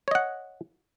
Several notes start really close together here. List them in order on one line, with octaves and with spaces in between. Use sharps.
C#5 D#5 F#5